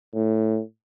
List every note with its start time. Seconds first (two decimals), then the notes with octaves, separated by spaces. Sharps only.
0.15 A2